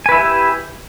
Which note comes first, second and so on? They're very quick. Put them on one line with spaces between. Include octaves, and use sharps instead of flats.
G#5 B4 E4 E5 G4